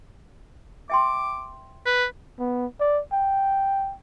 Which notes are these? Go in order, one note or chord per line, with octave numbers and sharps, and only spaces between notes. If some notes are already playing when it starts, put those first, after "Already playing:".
E5 G5 C6 D6
B4
B3
D5
G5